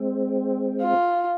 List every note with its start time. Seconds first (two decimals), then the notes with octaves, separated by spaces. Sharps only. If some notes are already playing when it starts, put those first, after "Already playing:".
Already playing: G#3 C4
0.81 F4